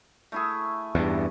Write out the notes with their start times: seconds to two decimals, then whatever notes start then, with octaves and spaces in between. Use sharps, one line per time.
0.32 A3 E4 G#4
0.95 E2 G2